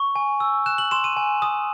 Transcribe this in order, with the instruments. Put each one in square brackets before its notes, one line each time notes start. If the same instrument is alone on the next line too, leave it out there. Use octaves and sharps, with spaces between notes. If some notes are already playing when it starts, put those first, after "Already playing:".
Already playing: [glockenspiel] C#6
G#5
E6
F#6 E7
F#7
C6 E7
D#7
G#5
D#6